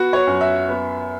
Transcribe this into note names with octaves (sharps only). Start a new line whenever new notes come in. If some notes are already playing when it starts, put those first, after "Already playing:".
Already playing: B3 F#4
C#5
F#2
E5
B3